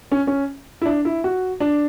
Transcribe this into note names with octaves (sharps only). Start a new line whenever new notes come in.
C#4
C#4
E4
D4
E4
F#4
D4